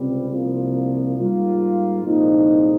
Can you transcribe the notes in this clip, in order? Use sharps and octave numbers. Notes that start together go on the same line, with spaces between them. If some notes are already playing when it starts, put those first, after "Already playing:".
Already playing: C#2 C3 G3 C4
C2 C3 F3 A#3 F4
G#2 G3 A#3 F4
C2 A#2 F3 G#3 D#4